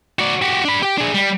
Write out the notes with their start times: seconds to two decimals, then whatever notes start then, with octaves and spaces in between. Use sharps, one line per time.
0.19 F#4 D5
0.42 F#4 G4
0.65 D4 B5
0.83 G4 G5
0.98 D4 G#4
1.14 G3